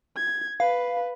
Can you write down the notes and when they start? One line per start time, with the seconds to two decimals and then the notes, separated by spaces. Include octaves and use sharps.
0.16 G#6
0.60 B4 F5